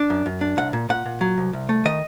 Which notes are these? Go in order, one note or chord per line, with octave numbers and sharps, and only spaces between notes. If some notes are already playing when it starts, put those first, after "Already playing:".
Already playing: D4
F#2
F#2
D4
C2 F#5
A#2
A#2 F#5
A#2
F#3
C2
C2
A3
D#3 D#5